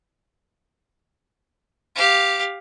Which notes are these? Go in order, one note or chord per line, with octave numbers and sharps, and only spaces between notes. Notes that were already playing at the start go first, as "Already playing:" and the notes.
G4 F5